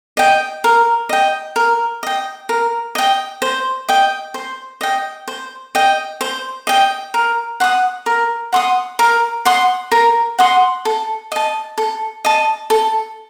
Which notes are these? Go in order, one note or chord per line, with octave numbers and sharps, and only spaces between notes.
D#5 G5
A#4
D#5 G5
A#4
D#5 G5
A#4
D#5 G5
C5
D#5 G5
C5
D#5 G5
C5
D#5 G5
C5
D#5 G5
A#4
F#5 C6 D#6
A#4
F#5 C6 D#6
A#4
F#5 C6 D#6
A#4
F#5 C6 D#6
A4
D#5 A5
A4
D#5 A5
A4